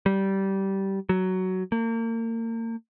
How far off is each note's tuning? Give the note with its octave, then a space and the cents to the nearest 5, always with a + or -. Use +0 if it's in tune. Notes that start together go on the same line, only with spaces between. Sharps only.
G3 -15
F#3 +10
A#3 -35